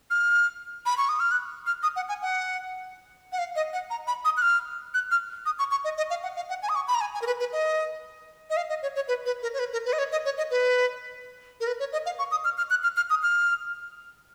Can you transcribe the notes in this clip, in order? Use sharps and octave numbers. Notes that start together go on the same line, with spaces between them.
F6
B5
C#6
D#6
F6
F#6
F6
D#6
F#5
G#5
F#5
F#5
F5
D#5
F#5
A#5
B5
D#6
F#6
F6
F#6
F6
D#6
C#6
C#6
D#5
D#5
F5
F#5
F5
F#5
G#5
D#6
C#6
B5
A#5
G#5
G#5
A#4
B4
B4
D#5
D#5
F5
D#5
C#5
C#5
B4
B4
A#4
C#5
B4
A#4
B4
D#5
C#5
D#5
C#5
D#5
B4
A#4
B4
C#5
D#5
F5
C#6
D#6
F6
F6
F#6
F6
F6
D#6
F6